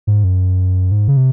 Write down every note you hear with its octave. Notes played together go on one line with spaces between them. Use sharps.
G#2
F#2
G#2
C#3
C3